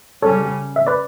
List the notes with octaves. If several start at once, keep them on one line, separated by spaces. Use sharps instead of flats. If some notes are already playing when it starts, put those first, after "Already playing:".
C#3 G3 C#4 A4 C#5
E5
B4 D5